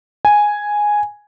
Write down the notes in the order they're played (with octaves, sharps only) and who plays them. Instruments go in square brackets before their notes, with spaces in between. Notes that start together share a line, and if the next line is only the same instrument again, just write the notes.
[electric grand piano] G#5